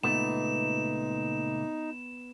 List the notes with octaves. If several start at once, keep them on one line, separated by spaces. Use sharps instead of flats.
C#2 A#2 A3 B3 D#4 E7